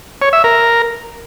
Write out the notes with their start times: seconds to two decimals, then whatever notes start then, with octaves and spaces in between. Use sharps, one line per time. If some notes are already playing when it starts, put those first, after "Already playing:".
0.22 C#5
0.33 E5
0.44 A#4